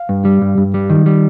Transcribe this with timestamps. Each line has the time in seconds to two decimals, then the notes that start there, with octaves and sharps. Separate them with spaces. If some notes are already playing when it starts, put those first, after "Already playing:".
Already playing: F5
0.09 G2
0.25 G3
0.42 G2
0.58 G2
0.74 G3
0.90 D#3
1.06 G3